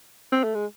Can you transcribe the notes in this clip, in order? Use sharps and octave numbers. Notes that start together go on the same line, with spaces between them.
C4
A3
G#3